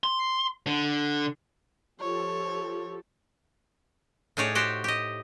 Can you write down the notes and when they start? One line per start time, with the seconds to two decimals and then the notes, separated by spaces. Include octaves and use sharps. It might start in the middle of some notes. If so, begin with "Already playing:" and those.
0.04 C6
0.67 D3
2.00 F3 G4 A4 C#5
4.37 A2 D#4 G#4 C#5 D5
4.55 F#4 G4 C5 G5
4.84 G4 D#5